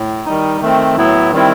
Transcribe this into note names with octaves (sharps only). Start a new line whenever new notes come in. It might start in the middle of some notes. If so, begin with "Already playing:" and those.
Already playing: A2
D#3 G3 D#4
D#3 A3 C4
A2 F#3 B3 E4
D#3 G3 C4 E4